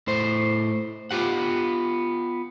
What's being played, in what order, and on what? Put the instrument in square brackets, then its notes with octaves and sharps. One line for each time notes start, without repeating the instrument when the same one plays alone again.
[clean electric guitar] A2 C5
B3 F4 G4 F#5